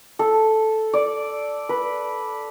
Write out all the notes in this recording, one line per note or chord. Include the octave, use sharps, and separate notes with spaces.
A4
D5
B4